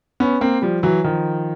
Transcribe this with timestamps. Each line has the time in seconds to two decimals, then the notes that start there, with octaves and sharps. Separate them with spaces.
0.20 B3 C#4
0.41 A#3 C4
0.62 F3 G3
0.83 E3 F#3
1.04 D#3 F3